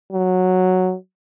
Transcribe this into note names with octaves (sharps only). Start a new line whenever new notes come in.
F#3